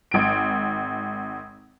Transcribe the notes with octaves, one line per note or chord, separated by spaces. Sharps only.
G#1 D7